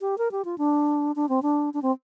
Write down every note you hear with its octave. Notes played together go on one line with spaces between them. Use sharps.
G4
A#4
G4
F4
D4
D4
C4
D4
D4
C4